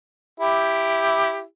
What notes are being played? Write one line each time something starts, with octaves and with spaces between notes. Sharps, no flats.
E4 G4